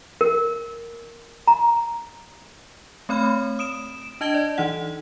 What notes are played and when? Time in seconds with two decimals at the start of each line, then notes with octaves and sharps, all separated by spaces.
0.21 A#4
1.47 A#5
3.09 A3 C4 C#5 B5 F6
3.59 D#6 D7 E7
4.21 D4 D#5 A5 G#6 D7 G7
4.34 D5
4.58 E3 D#4 F#5